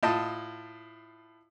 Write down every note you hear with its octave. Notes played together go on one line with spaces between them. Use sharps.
A2 F4 D#5 A5